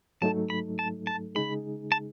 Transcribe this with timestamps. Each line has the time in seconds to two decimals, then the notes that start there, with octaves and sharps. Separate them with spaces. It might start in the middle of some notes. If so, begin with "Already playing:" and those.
0.21 G#2 F#3 A3 D#4 A4 A5
0.50 B5
0.79 A5
1.07 A5
1.35 C#3 G#3 D#4 G#4 B5
1.92 A5